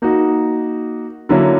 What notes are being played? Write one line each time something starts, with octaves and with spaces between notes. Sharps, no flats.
A#3 D#4 F#4
D3 F#3 A#3 C#4 E4